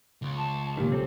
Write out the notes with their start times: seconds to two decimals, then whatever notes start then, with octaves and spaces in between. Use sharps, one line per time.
0.22 C#2
0.37 A5
0.77 A#2 D#3 G4
0.90 B1 C4 A4